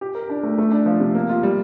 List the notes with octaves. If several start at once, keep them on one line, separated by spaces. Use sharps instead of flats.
G4
A#4
D4
A3
A3
D4
F3
C3
A#3
F4
G3